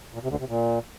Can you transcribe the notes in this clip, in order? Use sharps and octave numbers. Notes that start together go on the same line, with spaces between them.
A#2
C3
D2 D3
C3
A#2